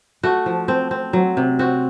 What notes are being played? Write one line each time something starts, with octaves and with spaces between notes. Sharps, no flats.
A3 F#4
F3
C4
C4
F#3
C3
C4 F#4